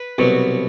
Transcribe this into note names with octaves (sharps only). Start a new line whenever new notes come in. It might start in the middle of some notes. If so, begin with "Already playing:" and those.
Already playing: B4
C2 B2 F#3